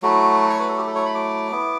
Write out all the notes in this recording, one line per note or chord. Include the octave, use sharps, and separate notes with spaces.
F#3 A3 E4 F#4
C#5
B4
A4
G4
A4
C#5
B5
D6
B3 E4